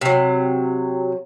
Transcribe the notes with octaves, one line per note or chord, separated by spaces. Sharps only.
C3 F#3